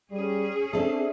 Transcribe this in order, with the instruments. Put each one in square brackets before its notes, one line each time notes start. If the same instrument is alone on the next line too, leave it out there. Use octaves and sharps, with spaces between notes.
[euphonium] G3 [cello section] C#4 G#4
[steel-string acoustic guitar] C4 A4 [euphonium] D4 [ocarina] E5